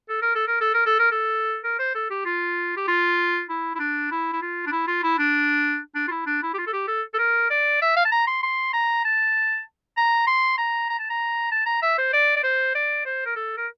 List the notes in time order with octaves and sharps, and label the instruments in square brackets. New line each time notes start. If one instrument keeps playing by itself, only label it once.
[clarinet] A4
A#4
A4
A#4
A4
A#4
A4
A#4
A4
A#4
C5
A4
G4
F4
G4
F4
E4
E4
D4
E4
E4
F4
D4
E4
F4
E4
D4
D4
F4
E4
D4
E4
G4
F4
A4
G4
A4
A4
A#4
D5
E5
F5
A5
A#5
C6
C6
A#5
A5
A#5
C6
A#5
A#5
A5
A#5
A5
A#5
E5
C5
D5
D5
C5
D5
C5
A#4
A4
A#4